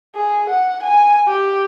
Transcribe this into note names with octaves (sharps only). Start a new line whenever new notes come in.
G#4
F#5
G#5
G4